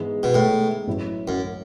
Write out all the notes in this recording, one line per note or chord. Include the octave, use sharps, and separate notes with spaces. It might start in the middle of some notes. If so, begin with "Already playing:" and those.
Already playing: G#2 E3 G#3 B3
B2
A2
A1 A2 F#3 C#4 E4
F#2